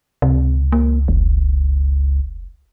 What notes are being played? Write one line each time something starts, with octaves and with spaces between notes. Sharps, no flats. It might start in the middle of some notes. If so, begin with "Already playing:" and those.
C#2 C3
A#3
F1